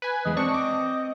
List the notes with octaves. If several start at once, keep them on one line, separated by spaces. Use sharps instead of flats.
B4 G#5
E2 G#3 D#5
C4 D4 C#6
D6